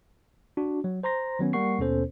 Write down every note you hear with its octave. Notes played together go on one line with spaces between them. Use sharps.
D4 F#4
F#3
C5 A#5 C6 A#6
D#3 F#3 B3 C#4
G3 A#3 A#4 F#5 C#6 C7
D#2 B2 B3 C#4 A4 C5